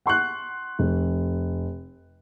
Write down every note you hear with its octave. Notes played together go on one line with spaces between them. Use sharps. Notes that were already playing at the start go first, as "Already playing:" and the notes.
F#5 C6 C#6 F#6
F1